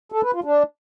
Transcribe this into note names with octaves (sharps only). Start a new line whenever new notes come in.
A4
B4
F4
D4